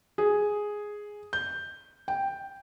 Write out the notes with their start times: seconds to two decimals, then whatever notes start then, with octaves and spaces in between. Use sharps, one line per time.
0.18 G#4
1.33 G6
2.08 G5